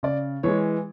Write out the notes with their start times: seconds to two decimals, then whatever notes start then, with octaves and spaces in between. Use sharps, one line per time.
0.03 C#3 D5
0.43 E3 G#3 C#5